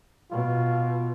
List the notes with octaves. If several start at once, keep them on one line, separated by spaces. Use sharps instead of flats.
B2 F4